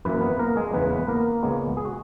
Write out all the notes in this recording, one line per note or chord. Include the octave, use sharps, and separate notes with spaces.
F#2 E3 A#3 B4
B3 B4
A#3 A#4
G#3 G#4
E2 C#3 E3 G#3 B3 B4
B3 B4
A#3 A#4
C#2 C#3 G#3 B3
G#4
F#4